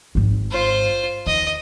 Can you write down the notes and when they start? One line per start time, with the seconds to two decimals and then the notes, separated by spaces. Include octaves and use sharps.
0.15 G#1 G#2
0.51 F4 C5
1.27 D#2 D#5